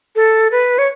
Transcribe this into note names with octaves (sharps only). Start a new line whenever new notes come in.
A4
B4
C#5